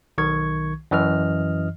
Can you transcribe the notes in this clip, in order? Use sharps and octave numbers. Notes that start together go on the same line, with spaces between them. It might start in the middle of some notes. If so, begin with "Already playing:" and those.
B1 D#3 C#6 G#6
F#2 E3 D#5 F6